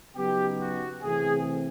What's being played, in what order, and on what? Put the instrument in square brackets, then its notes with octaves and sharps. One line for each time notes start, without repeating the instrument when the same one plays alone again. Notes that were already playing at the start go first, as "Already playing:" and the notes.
[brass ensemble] C#3 F#3 B3 D#4 G4
F#4
C3 E3 A3 C4 G#4